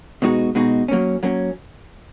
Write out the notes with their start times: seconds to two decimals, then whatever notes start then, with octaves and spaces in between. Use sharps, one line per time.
0.22 B2 G#3 D#4 F#4
0.55 B2 G#3 D#4 F#4
0.88 F#3 A#3 C#4
1.23 F#3 A#3 C#4